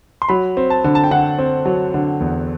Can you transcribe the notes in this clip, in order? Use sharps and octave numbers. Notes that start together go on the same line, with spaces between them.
C6
F#3 B5
C4
A5
D3
A5
G5
D3 F#5
C4
F#3
D3
E2